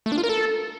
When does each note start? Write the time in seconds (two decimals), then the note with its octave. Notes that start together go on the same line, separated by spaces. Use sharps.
0.06 A3
0.12 D4
0.18 F4
0.23 A#4
0.29 A4